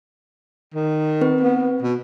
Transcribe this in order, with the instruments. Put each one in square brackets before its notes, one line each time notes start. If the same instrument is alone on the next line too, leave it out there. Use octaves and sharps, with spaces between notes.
[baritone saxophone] D#3
[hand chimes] C4 B4
[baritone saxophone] B3
B2